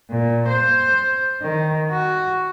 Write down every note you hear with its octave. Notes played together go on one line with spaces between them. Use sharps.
A#2
C5
D#3
F#4